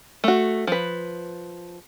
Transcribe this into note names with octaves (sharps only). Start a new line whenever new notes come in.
A3 F#4
F3 B4